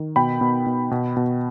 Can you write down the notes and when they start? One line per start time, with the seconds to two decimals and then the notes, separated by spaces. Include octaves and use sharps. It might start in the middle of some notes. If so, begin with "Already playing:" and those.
Already playing: D#3
0.16 B2 G5 B5
0.41 B2
0.66 B2
0.91 B2
1.17 B2